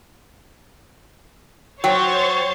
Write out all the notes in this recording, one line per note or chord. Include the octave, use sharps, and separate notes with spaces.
F#3 C5 C#5 G5 A6